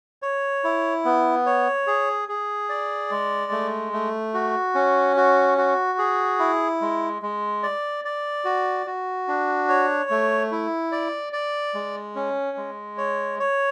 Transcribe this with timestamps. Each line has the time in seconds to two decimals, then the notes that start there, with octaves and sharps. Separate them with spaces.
0.22 C#5
0.64 E4
1.05 B3
1.46 C#5
1.87 G#4
2.28 G#4
2.69 D5
3.11 G#3
3.52 A3
3.93 A3
4.34 F#4
4.75 C#4
5.17 F#4
5.58 F#4
5.98 G#4
6.39 E4
6.81 G#3
7.22 G#3
7.63 D5
8.05 D5
8.45 F#4
8.86 F#4
9.28 D4
9.69 C#5
10.10 A3
10.52 E4
10.92 D5
11.33 D5
11.74 G#3
12.15 C#4
12.57 G#3
12.98 C#5
13.40 C#5